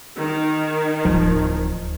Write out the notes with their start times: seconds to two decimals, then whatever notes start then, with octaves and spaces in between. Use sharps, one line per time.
0.17 D#3
1.05 D1 F3